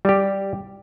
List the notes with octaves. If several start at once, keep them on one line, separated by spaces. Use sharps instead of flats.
G3 G4